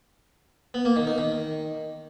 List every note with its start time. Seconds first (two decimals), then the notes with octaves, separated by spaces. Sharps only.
0.74 B3
0.85 A#3
0.96 D#3
1.07 D#4
1.18 D#3